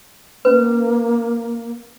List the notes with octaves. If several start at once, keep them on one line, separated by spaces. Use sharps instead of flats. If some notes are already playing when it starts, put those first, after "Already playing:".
A#3 C#4 B4